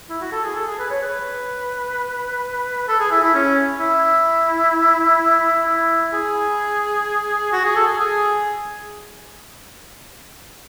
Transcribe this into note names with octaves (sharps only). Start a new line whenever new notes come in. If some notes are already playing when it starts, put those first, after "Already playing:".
E4
F#4
A4
G#4
A4
G#4
B4
C#5
B4
A4
G#4
E4
E4
C#4
E4
E4
G#4
F#4
G#4
A4
G#4
G#4